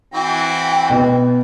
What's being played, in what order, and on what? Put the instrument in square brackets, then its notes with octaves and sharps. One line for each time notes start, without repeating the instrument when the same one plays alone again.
[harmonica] E3 C4 F#4 [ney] G5
[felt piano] B2 B3